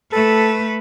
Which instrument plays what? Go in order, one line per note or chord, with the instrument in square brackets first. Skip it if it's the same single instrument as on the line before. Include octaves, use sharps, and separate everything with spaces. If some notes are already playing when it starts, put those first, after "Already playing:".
[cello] A3 B4 [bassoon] A4